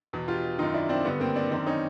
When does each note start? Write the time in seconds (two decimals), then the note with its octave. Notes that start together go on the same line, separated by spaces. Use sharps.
0.13 E2 B2
0.28 F4 G4
0.58 F#2 D#3 D#4 F4
0.74 D4 E4
0.89 C4 D4
1.05 G2 D3 B3
1.20 A#3 C4
1.36 C4 D4
1.51 F#2 D#3 C4 D4
1.66 C#4 D#4